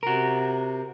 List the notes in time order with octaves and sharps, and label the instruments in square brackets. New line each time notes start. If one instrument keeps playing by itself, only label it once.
[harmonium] C3 [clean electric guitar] F#4 A#4